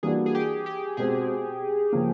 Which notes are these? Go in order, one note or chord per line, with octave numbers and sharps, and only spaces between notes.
E3 G3 A#3 D4 F#4 G#4
G#4
G4
G4
B2 G#3 C4 G#4
C#3 F3 A#3 C#4